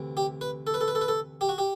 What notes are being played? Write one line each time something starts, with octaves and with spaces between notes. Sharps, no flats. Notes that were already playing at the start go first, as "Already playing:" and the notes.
Already playing: D2 C3 E3
G4
B4
A4
B4
A4
B4
A4
B4
A4
G4
F#4
G4